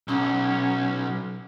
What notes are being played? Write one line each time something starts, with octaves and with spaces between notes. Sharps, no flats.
B1 C#4